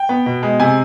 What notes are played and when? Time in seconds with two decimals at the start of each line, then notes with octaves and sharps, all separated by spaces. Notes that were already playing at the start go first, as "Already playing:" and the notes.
Already playing: G5
0.09 B3
0.26 B2
0.43 G#3
0.60 C3 G#5